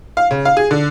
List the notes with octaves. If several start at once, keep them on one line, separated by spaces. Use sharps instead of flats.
F5
C#3
F5
G#4
D3